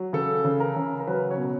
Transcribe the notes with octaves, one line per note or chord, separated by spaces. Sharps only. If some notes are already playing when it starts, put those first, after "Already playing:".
Already playing: F#3
C#3 A4
C#3
A#4
C#3
A#4
F#3 B4
C#5
B2